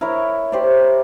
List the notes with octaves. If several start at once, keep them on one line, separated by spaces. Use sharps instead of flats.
E4 A#4 C#5
G4 C5 D5